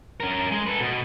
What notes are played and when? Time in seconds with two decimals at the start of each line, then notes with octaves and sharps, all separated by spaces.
0.20 C#4 A#4
0.52 G#3
0.67 A4 B4
0.81 B2